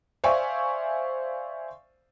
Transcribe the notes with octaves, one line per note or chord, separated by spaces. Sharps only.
C5 D5 E5 F5 G#5 C#6